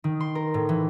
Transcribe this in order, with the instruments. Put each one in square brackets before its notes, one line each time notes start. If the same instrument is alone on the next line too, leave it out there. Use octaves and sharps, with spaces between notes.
[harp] D#3
C6
A#4
A2
E3